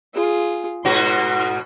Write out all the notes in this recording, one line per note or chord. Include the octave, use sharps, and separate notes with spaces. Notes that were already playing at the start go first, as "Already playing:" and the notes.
F4 G#4
G#2 B2 F#4 C6